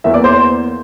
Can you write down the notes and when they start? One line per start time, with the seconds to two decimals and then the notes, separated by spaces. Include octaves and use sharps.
0.04 E2 E3 A#3 E5
0.14 D5
0.24 C5